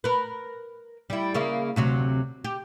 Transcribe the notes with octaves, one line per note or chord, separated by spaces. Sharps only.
A#4 B4
G3 E4
C#3 A#3 E4
D2 C3 F#3
G4